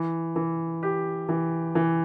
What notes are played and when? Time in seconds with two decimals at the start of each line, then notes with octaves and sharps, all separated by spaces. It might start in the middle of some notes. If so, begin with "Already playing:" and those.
Already playing: E3
0.36 E3
0.83 G4
1.29 E3
1.75 E3